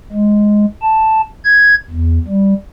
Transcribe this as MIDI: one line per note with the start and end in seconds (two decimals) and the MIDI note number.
0.12 0.66 56
0.82 1.22 81
1.44 1.75 92
1.91 2.19 40
2.28 2.54 55